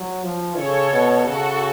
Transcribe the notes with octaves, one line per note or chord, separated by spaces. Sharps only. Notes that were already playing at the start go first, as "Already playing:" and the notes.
Already playing: F#3
F3
C#3 A4 C#5
B2
C#3 F#4 A4